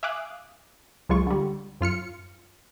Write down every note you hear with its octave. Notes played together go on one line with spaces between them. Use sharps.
E5 F5 G#5 D6 D#6 F#6
C#2 F#3 G#3 F4 C#6
D3 G3
F#2 F4 F6 C#7